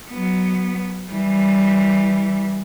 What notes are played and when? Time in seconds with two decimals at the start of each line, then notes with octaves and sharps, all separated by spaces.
0.11 F#3 B3
1.11 E3 G3